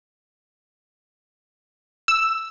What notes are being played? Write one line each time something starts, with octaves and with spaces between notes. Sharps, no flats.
E6